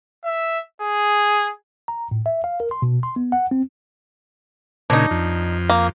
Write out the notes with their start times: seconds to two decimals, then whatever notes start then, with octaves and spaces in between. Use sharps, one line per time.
0.25 E5
0.82 G#4
1.88 A#5
2.11 A2
2.26 E5
2.44 F5
2.60 A#4
2.71 C6
2.82 B2
3.03 C6
3.16 B3
3.32 F#5
3.51 C4
4.90 A#2 C#3 D4 D#4
5.11 F2
5.69 A#3